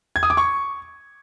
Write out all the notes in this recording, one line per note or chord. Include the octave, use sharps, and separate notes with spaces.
G#6
D#6
D6
C#6